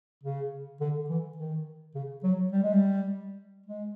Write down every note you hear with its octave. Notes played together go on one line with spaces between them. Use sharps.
C#3
D3
E3
D#3
C#3
F#3
G3
G#3
G3
G#3